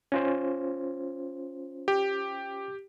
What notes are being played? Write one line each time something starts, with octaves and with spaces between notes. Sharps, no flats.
C#4 F4 C5
G4